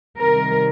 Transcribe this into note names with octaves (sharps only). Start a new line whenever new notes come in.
C3 D#3 G3 A#4